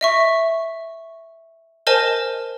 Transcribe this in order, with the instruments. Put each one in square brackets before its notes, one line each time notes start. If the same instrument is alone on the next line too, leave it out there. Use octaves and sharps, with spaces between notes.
[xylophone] D#5 E5 C#6
A#4 C5 D#5 G#5 A5